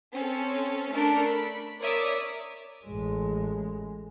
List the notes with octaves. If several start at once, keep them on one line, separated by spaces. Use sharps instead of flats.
C4 C#4 A4
A3 D4 A4 A#4 A5 D7
B5
A#4 C#5 D5 E5 D6 D#6
A1 G#3